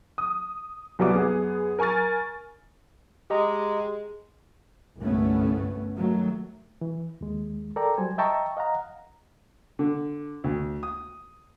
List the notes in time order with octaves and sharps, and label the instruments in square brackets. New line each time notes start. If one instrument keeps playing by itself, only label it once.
[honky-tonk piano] D#6
C2 F#3 G3 B3 E5 D6
F#2 B3 G#4
A#4 G#5 C#6 F6 A6
[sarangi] G#3 [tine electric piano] G4 D#5 A#5
[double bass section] G1 C2 G2 A3 B3 C#4
D#3 F#3 A3
[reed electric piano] E3
D#2 G#3
A4 A#4 D5 G5 A#5
F#3 G3 C5 G#5
D#5 E5 G5 A5 A#5 C#6
D#5 F5 F#5 A#5
[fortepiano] D3
D2
D#6